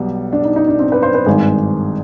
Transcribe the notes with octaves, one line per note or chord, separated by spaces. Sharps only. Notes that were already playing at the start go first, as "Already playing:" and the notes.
Already playing: B1 B2 G3
D4
D#4
D#4
D4
C4
B4
C5
B4
G#1 G2 D#3 G#3 G#4